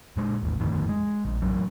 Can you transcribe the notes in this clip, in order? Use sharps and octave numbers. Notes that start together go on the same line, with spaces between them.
A#2 G#3
D#1 A1
G1 F2 A2 D#3
G#3
A#1
A1 F#2 F#3